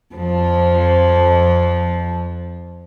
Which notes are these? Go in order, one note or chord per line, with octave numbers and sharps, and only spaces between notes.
F2 F3